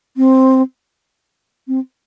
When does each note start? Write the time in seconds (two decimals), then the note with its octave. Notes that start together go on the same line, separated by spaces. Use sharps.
0.17 C4
1.68 C4